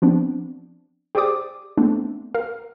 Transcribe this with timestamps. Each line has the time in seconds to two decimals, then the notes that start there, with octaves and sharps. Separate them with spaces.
0.02 F3 B3 C4 D4
1.15 G4 G#4 C5 D5 D6 D#6
1.77 A3 B3 C4 D4
2.35 A#4 F5